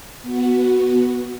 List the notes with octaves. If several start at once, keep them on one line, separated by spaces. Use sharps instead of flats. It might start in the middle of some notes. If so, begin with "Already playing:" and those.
B3 F#4